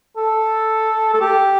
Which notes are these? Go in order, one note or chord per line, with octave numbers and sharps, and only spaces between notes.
A4
A4
G4